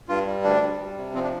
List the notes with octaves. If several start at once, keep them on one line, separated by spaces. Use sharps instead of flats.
G2 F4
G3
D2 D4
G3
G3
C3
F3 C4
D4